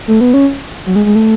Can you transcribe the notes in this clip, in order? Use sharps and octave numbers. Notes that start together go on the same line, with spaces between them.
A3
B3
C#4
F#3
G#3
G#3
A3